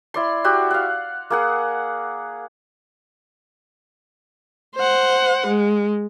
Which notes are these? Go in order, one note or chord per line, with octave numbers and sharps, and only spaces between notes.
E4 D5 C6
F#4 G4 E5 F#5
F5 F#5
A#3 G#4 F#5
C5 F#5
G#3